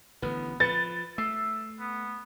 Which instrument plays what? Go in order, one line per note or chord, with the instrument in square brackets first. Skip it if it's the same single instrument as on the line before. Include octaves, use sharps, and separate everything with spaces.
[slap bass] A1 D3 [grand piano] B3
[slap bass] F3 [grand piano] B4 C#7 [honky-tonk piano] A6
[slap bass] A3 [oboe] E5 [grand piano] E6 C7
[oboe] B3